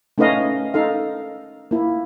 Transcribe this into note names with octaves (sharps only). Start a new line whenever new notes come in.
A3 C#4 D#4 B4 D#5 F5
D#4 A4 F5
A#3 E4